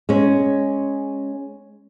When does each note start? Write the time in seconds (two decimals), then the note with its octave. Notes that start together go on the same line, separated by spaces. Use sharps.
0.09 G#3 C#4